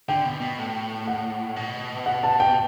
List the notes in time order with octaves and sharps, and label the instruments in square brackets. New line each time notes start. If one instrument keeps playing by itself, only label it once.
[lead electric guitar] D3 [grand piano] G5
[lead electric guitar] B2
B2
A2
[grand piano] F#5
[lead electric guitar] B2
[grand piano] F#5
A5
G5